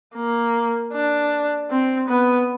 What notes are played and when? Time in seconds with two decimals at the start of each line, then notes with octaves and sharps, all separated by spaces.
0.15 A#3
0.93 D4
1.70 C4
2.08 B3